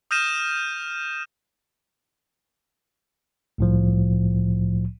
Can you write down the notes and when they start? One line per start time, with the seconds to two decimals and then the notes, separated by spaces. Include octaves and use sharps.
0.11 D#6 F6 G6 A#6 D#7 E7
3.58 C2 A2 F3